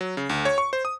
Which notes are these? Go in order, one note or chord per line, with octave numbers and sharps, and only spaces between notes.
F#3
C#3
D2
C#5
C#6
C5
D#6